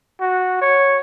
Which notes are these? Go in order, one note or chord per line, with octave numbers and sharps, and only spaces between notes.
F#4
C#5